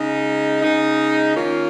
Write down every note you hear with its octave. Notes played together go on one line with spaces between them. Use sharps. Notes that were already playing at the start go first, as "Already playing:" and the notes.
Already playing: C#3 G#3 D#4
C#3 G#3 D#4
D#3 A#3 C#4 F4